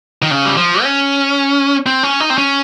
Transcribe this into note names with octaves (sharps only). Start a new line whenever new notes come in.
D#3
C#3
G3
F3
C#4
C4
C#4
D#4
C4
C#4